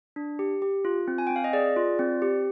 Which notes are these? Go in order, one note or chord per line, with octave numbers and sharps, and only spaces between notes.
D4
G4
G4
F4
C4
G#5
C4 G5
F5
D#5
G#4 D5
F4
C4
G4